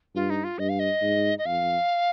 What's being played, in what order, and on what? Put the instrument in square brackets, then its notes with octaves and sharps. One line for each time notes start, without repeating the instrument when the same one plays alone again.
[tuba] G2 [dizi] F4
[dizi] D#4
F4
[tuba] G2 [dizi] D#5
[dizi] F5
D#5
[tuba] G#2
[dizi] D#5
[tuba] F2 [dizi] F5